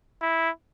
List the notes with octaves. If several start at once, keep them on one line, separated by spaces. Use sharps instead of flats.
E4